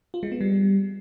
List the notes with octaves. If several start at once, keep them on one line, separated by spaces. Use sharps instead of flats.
F4
G#3
B3
G3